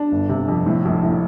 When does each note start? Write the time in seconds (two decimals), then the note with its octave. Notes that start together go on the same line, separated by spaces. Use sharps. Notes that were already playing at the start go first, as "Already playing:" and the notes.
Already playing: D4
0.12 G1
0.29 C3
0.48 F2
0.66 A2
0.85 A#1
1.03 A2